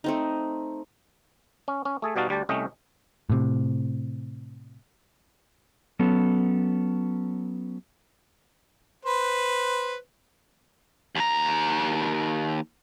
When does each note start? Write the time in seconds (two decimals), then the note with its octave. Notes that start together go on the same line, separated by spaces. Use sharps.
0.04 A3 C4 D#4
1.68 C#4
1.85 C#4
2.02 A3 G#4 A4
2.16 B2 G3 D#4 F#4 F5 A5
2.29 D2 G3 G4 A5
2.49 C2 A3 C#4 D#5 G5
3.30 A2 C3
5.99 F#3 B3 C#4 A4
9.05 B4 C5
11.16 D#2 A#5